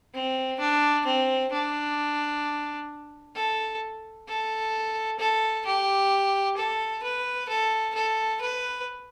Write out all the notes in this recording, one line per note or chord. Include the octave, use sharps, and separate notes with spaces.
C4
D4
C4
D4
A4
A4
A4
G4
A4
B4
A4
A4
B4